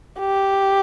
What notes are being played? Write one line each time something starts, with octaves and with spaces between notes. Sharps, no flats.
G4